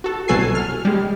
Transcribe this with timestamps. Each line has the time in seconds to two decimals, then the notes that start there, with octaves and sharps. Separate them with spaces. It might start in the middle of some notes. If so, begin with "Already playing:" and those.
0.04 F#4 A4
0.28 C2 B2 F#3 A4 G#5 C7
0.55 F6
0.85 G3 G#3